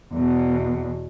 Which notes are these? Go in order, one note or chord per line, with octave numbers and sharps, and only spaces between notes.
E2 B2